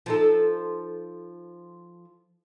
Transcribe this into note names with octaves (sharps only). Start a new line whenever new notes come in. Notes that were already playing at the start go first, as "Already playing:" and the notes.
F3 D#4 A4